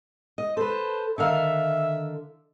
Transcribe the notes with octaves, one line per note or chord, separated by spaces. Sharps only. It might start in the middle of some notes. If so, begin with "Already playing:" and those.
D#5
A4 B4 C5
D3 D#3 E5 F5